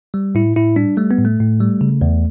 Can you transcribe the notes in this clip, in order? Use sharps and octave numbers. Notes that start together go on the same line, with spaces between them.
G3
A2 E4
A2 E4
G3 D4
G3 A3
B3
A2
A3
A2
G3
C#3
E2